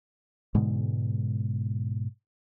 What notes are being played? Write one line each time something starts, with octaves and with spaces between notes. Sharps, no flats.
G#2 B2 D3 G#3